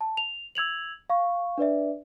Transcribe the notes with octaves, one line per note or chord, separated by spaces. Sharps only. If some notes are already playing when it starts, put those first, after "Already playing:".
A5
F7
E6 G#6 F7 F#7
F5 C#6
D4 B4 D5 E5